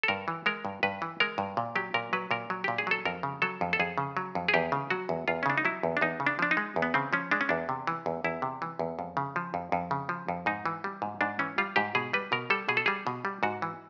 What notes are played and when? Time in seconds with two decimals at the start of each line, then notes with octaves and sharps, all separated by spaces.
0.03 A4
0.08 G2 A#4
0.28 E3
0.46 G#3 A#4
0.65 G2
0.83 G2 B4
1.02 E3
1.20 G#3 A#4
1.38 G2
1.57 A#2
1.76 F#3 G4
1.94 A#2 A#4
2.13 F#3 B4
2.31 A#2 A#4
2.50 F#3
2.64 A#2 G4
2.78 G#4
2.87 F#3 A4
3.05 F2 A#4
3.23 C#3
3.42 F#3 A4
3.61 F2
3.73 A4
3.80 F2 G#4
3.98 C#3
4.17 F#3
4.35 F2
4.48 G#4
4.54 E2 G4
4.72 C#3
4.90 F#3 F#4
5.09 E2
5.28 E2 F4
5.43 C#4
5.46 C#3 D4
5.58 D#4
5.65 F#3 E4
5.83 E2
5.97 D4
6.01 E2 D#4
6.20 C#3
6.27 D4
6.39 F3 D4
6.51 D#4
6.57 G#3
6.76 E2
6.82 B3
6.94 C#3 C4
7.13 F3 C#4
7.31 G#3 D4
7.41 C#4
7.49 E2 D4
7.69 C3
7.87 E3
8.06 E2
8.24 E2 E4
8.42 C3
8.62 E3
8.79 E2
8.99 F2
9.17 C#3
9.36 F3
9.54 F2
9.72 F2
9.91 C#3
10.09 F3
10.29 F2
10.46 G#2 D#4
10.66 E3
10.84 G3
11.02 G#2
11.21 G#2 D4
11.39 E3 C#4
11.58 G3 F4
11.76 G#2 G4
11.95 B2 G#4
12.13 G3 B4
12.32 B2 A#4
12.50 G3 A4
12.69 B2 G#4
12.77 A4
12.86 G3 G#4
13.07 B2
13.25 G3
13.43 G#2 F#4
13.62 E3